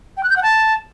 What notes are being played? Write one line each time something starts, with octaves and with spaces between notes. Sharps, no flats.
G5
F#6
G6
F#5
A5